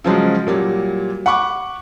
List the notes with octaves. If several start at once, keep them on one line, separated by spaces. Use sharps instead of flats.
C#3 F3 F#3 G#3
A#2 F#3 G3
F#5 B5 C#6 D6